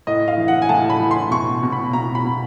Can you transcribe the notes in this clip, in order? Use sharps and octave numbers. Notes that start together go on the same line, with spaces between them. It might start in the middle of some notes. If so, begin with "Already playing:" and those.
A2 D#5
F5
E3
F#5
G#5
A2 A5
B5
E3
C6
B2 C#6
B2
B5
B2 A#5
B5
B2